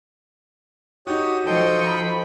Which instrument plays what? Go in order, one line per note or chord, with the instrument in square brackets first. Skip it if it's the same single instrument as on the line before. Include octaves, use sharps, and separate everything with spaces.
[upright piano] D#4 F#4 [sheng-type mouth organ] G4 C#5 D#6
[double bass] F3 [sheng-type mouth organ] A4 G5 [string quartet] D#5 C6 C#6
[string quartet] B5